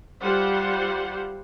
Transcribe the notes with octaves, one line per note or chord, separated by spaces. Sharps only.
G3 F4 C5 F#5